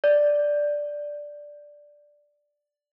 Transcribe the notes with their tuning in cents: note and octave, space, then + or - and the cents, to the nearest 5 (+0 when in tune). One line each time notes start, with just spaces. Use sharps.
D5 +0